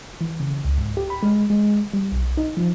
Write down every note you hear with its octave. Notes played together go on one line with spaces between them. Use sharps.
E3
C#3
C#2
G#2
G4
B5
G#3
G#3
G3
B1
D#4
F3